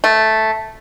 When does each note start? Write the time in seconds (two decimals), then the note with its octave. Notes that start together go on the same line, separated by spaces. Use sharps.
0.04 A3